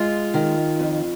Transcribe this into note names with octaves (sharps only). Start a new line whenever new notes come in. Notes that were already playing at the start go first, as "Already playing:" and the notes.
Already playing: G#3 F4
D#3
F2